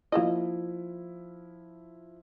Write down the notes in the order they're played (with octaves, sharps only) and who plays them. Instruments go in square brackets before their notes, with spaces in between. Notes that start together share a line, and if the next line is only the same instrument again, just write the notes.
[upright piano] F3 E4 [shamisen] A#3 D#4 D#5